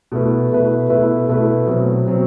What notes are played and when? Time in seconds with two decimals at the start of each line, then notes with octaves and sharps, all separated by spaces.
0.12 B2 A3 E4 B4
0.51 B2 A3 E4 B4
0.89 B2 A3 E4 B4
1.28 B2 A3 E4 B4
1.67 B2 F#3 C4
2.06 B2 F#3 C4